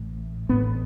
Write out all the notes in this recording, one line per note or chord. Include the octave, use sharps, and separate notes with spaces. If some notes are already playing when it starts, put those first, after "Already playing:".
Already playing: A1 A2
A1 A2 B3